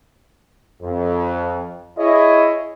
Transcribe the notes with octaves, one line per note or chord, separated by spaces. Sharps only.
F2
E4 G#4 C#5 D#5